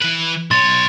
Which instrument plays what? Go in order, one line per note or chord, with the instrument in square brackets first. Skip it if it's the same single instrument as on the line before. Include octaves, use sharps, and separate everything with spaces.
[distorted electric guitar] E3 B4
[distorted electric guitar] B1 C#5 [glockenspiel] C6 A6